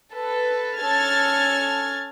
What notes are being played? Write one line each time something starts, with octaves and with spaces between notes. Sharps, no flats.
A4 B4
C#4 A4 F6 G#6 A6